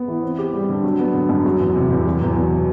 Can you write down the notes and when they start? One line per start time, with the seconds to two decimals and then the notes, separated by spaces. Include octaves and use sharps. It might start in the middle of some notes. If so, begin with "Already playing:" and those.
Already playing: B3
0.08 E3
0.22 C4
0.38 G4
0.53 G3
0.69 D3
0.83 F#3
0.99 B3
1.14 D3
1.29 F#2
1.45 F#3
1.60 E2
1.75 C3
1.90 E2
2.07 F#3
2.22 E2
2.36 B2